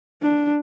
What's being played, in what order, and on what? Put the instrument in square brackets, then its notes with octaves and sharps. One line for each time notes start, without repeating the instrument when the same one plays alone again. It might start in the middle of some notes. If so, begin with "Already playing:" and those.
[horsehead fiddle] D4